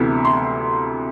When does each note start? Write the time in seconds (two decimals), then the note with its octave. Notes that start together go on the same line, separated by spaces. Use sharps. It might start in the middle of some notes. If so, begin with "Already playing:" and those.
Already playing: D2 C3 E3 B3
0.25 C6